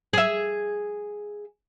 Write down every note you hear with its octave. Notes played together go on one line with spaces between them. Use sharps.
G#4 E5